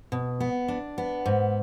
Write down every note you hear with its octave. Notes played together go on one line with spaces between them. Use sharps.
B2
B3
D4
B3
G#2